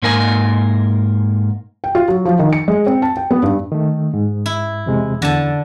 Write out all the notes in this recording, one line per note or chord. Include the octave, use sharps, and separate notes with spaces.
G#2 A#3 A#4 G#5
G5
F4
F#3
F3
D#3
C#7
G#3
C4
A5
G5
B3
G2
D#3 A3
G#2
E4
E2 C3 G#3
E2 D3 A5